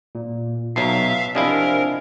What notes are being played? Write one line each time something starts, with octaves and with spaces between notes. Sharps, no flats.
A#2
B1 B2 F#3 E5 F5 C7
C3 F3 D4 E4 A#4 D#5 G#5